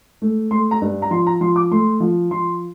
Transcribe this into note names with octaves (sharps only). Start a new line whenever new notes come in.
A3
A3 C6
A#5
G2
A#5
F3 C6
A#5
F3 C6
D6
A3 C6
F3
F3 C6